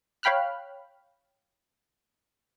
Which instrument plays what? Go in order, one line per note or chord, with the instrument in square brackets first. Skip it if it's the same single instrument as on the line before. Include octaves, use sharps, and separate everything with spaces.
[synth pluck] C#5 F5 G5 B5 F6 F#6